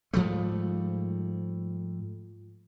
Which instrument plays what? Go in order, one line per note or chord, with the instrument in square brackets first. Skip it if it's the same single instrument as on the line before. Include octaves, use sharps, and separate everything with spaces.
[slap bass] G#2 F3 G3 A3